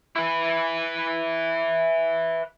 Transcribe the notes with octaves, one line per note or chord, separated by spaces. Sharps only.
E4 B4